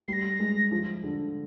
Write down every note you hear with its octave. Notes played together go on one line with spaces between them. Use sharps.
G3 A#6 C7
G#3
F3
D3